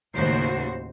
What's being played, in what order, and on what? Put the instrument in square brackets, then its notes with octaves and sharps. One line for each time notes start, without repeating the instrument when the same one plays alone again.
[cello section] D#2 A2 C#3 F#4 C5